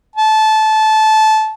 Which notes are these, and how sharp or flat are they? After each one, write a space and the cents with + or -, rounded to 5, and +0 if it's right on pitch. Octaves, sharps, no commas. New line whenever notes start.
A5 -20